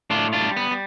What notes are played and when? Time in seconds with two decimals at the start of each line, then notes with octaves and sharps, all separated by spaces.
0.10 A2 D4 F4
0.33 D4 F4
0.41 G3
0.56 B3
0.71 G3